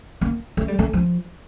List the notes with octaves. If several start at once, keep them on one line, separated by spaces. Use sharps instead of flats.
A#3
A3
G3
A3
F3